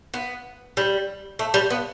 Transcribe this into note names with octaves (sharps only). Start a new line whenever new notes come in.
B3
G3
A3
G3
B3